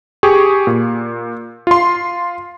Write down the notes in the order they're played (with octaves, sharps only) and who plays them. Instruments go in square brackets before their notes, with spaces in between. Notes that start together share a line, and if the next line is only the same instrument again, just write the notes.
[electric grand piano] G4 G#4 C#6
A#2
F4 C6